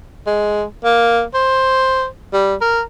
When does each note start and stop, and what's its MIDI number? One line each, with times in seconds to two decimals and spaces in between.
0.26 0.64 56
0.84 1.23 58
1.34 2.06 72
2.33 2.55 55
2.61 2.82 70